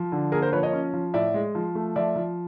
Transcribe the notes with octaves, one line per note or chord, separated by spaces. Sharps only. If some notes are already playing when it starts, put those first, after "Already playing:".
Already playing: F3
D3
A#3 G#4 A#4
A#4 C5
F3 B4 C#5
C#5 D#5
C#4
F3
A2 D5 E5
G#3
F3
A3
F3 D5 E5
F3